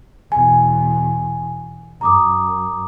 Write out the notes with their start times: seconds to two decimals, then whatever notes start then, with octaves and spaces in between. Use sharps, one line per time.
0.32 E2 B2 G#5
2.01 F#2 A#5 D6 D#6